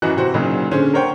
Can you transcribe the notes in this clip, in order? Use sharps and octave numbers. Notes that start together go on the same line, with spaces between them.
F#2 E3 F#4 D#5 F#6
C3 E3 F#4 C5
A#2 C#3 F#3 D#4
D3 C#4 G#4 C5
A#4 C5 C#5 F#5 G5 C6